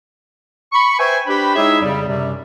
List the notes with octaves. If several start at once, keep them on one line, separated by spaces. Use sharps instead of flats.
B5 C#6
B4 C5 E5 G5 G#5
D4 G4 B4 C5 G5 B5
G#3 D#4 E4 G#4 C#5 E5
F2 C#3 G3
F#2 C3 G3